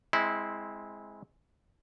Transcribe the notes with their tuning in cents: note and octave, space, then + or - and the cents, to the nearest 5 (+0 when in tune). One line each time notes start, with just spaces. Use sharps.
G#3 +0 C4 +0 E4 -20